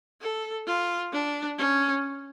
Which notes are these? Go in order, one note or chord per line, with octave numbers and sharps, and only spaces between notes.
A4
F4
D4
C#4